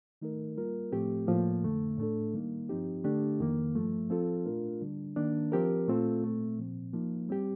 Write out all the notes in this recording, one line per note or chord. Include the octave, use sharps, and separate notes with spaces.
D#3 A3 D#4 A#4
G3 A#3 F4 A#4
A2 F3 A3 C4 G4
A2 F3 A#3
F2 D3 A3
A2 A3 D4 A4
D#3 G3 A#3 D#4
G2 F3 C4 D#4 G4
D3 A3 D4 G4
F2 D#3 A#3
G2 F3 A3
F3 C4 F4 A4
A#2 A3 D4 F4 A#4
D3 G3 D4
D#3 A#3 D4
F3 C4 G4 A#4
A#2 A3 C4 F4 A4
A#2 A3 C4
A#2 F3 C4
F3 A#3 D#4
G3 C4 G4